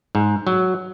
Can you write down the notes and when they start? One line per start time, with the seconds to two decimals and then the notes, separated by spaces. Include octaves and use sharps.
0.15 G#2
0.47 F#3